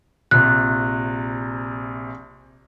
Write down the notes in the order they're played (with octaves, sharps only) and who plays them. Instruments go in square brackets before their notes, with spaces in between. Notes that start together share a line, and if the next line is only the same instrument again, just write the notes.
[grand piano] A#1 C3 [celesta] F#6